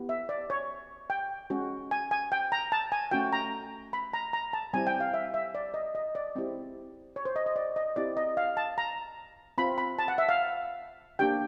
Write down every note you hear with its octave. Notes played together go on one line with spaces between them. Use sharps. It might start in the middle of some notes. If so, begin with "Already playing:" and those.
Already playing: B3 E4 G4
E5
D5
C#5
G5
G#3 C#4 F#4
G#5
G#5
G5
A#5
A5
G#5
A3 C#4 F#4 G5
A#5
B5
A#5
A#5
A5
G3 C4 E4 G4 G#5
G5
F5
E5
E5
D5
D#5
D#5
D5
G#3 C4 E4 G4
C#5
C5
D#5
D#5
D5
D#5
C4 E4 G4 D5
D#5
F5
A5
A#5
C4 F4 B5
B5
A5
F#5
E5
F5
A#3 D4 G4 G5